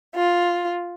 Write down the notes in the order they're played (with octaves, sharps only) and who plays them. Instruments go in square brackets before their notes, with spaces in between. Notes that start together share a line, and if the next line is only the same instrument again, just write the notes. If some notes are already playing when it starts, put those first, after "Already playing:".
[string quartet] F4